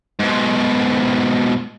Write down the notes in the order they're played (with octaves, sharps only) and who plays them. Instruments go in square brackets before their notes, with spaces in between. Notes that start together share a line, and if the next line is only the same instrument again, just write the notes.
[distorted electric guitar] G#2 B2